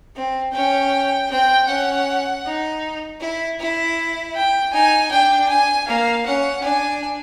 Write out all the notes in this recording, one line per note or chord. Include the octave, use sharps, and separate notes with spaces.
C4
C#4 G5
C4 G5
C#4 F#5
D#4
E4
E4
G5
D#4 G#5
D4 G5
G#5
A#3 F5
C#4 F#5
D4 G#5